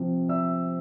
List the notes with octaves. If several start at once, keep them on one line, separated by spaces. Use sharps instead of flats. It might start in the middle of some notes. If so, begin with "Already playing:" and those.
Already playing: C3 F3 C4
E5 E6